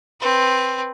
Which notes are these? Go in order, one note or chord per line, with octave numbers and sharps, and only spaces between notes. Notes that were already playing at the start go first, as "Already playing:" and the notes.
C4 B4